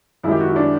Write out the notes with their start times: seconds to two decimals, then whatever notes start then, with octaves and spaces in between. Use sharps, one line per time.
0.24 F#2 D#3 G#3 E4
0.31 G4
0.40 F#4
0.48 E4
0.56 D4